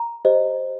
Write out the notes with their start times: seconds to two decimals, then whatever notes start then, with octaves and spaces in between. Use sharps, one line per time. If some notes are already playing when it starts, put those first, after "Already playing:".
Already playing: A#5
0.25 G4 C5 D#5